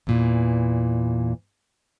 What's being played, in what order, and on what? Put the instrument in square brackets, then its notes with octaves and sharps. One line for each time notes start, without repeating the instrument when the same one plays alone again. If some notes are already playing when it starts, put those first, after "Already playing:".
[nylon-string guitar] E2 A#2 E3